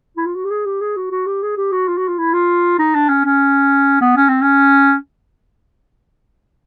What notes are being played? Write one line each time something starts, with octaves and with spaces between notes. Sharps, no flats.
E4
F4
F#4
G4
G#4
G4
G#4
F#4
F#4
G4
G#4
G4
F#4
F4
F#4
F4
E4
F4
D#4
D4
C#4
C#4
B3
C#4
C4
C#4